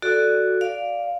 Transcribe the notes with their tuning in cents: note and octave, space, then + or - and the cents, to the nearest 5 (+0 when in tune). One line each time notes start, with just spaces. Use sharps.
F#4 +0 A4 +0 D5 +0
D5 -5 F5 +0